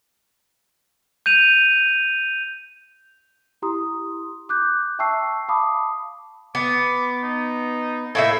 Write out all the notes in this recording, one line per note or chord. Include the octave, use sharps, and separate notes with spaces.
G6 D#7 F7
E4 G4 A#5 C6 D#6
D6 F#6 G6
E5 G5 A5 C#6 E6 C7
F5 A5 B5 D6 D#6
B3 D6
D#4
A2 A#3 E5